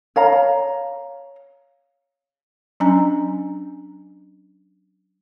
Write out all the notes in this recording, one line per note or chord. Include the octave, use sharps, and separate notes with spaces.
C#5 F5 A#5
F#3 C#4 D4 G#5 A#5